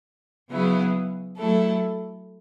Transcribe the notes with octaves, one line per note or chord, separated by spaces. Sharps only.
C#3 F#3 B3 E4 G#4
F#3 A3 E4 A4